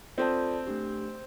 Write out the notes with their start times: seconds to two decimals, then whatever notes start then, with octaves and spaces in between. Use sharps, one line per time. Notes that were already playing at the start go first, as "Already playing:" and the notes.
0.18 C4 F4 A4 D5 A5
0.67 A3 D4 G4